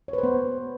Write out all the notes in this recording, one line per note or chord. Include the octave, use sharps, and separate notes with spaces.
C#5
B4
C5
B3